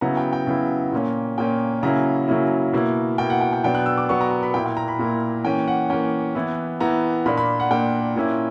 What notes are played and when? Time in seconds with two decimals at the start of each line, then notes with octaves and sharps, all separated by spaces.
0.01 C#3 F#3 B3 E4 A#5
0.17 G5
0.33 G5
0.47 C#3 F#3 B3 E4
0.92 A#2 A#3 C#4
1.38 A#2 A#3 C#4 G5
1.83 C#3 F#3 A#3 C#4 E4 A#5
2.28 C#3 F#3 A#3 C#4 E4
2.73 B2 A#3 E4
3.18 B2 A#3 E4 G5
3.30 F#5
3.41 G5
3.53 G5
3.64 B2 F#3 B3 D4 G5
3.75 F#6
3.86 E6
3.98 D6
4.09 B2 F#3 B3 D4 C#6
4.21 A#5
4.31 A#5
4.43 B5
4.54 A#2 A#3 E4 G5
4.66 G5
4.77 A#5
4.88 B5
4.99 A#2 A#3 E4
5.44 E3 A#3 C#4 G5
5.68 F#5
5.90 E3 A#3 C#4 G5
6.35 E3 B3 E4
6.80 E3 B3 E4 A#5
7.26 A#2 A#3 D4 B5
7.37 B5
7.60 F#5
7.70 A#2 A#3 D4 G5
8.16 A#2 A#3 C#4 E4